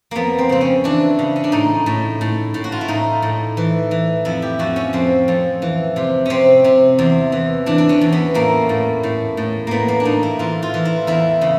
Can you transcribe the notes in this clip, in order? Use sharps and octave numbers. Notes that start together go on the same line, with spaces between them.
F2 A#3 B3
C4
C#3 C4
C#4
E3 D4
C#3
C#4
D4
A2 D#4
A2
A2
A2
F#4
F4
E4
A2 D#4
A2
E3
E3
F2 E4
G4
F2 F#4
C#4
F2 C4
F2
E3
C3
C3 C4 C#4
C3
E2
E3
E3 D4
D4
C#4
E2
B3
A2 A#3
A2
A2
A2
A2 A#3 B3
A#3
D4
A2 D#4
E4
E3 F4
F4
E3
E4
E2 E4
C#3